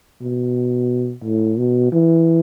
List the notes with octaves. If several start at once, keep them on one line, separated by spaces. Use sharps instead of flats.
B2
A2
B2
E3